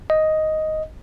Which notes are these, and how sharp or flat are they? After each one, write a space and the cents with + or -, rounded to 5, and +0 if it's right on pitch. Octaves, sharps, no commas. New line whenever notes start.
D#5 +5